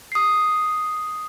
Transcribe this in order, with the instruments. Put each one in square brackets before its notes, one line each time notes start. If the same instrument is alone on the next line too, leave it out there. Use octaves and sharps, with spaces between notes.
[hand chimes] D#6 C7